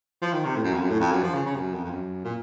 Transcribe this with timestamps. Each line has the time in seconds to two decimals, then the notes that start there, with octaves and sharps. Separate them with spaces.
0.22 F3
0.33 D#3
0.45 C3
0.56 A2
0.64 F#2
0.73 F2
0.81 F#2
0.90 A2
1.00 F2
1.12 F#2
1.24 F3
1.34 C#3
1.46 C#3
1.57 F#2
1.74 F2
1.84 F2
1.91 F#2
2.24 A#2